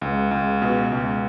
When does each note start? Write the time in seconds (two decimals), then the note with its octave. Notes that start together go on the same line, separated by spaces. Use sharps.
0.02 C#2
0.31 C#2
0.62 B2
0.92 C#2